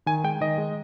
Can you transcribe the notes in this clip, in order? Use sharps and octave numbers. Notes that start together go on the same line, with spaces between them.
D#3 G#5
G#3 G5
D#3 D#5
G#3